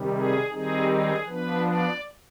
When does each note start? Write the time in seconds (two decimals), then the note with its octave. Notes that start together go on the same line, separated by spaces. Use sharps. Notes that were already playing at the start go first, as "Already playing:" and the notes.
Already playing: C3 D#3 G3
0.12 G#4
0.50 D#3 G3 C4 D#4 G#4
0.88 G#4
1.25 F3 B3 D4 B4
1.63 D5